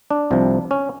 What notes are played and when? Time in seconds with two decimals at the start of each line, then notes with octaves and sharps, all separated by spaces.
0.11 D4
0.31 C2 C3 F3
0.71 C#4